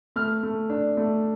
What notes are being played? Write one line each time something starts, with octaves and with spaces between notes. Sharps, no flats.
A3 F6
A3
D4
A3